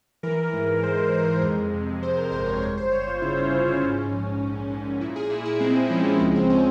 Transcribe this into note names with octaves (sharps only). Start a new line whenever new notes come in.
E3 A#4
G#2
G#3 C5
G#3
F2
C3
C3 C5
A#4
G1 C5
C#5
G1 C#5
C5
G1 C#5
F4
C#3 E4
C#4
C#3 F4
F4
G#2 C#4
A#1
G#2
G#2
A#2 E4
G#4
A#2 E4
E4
G#3 C4
F3 C#4
C#2 E4
C4
C#4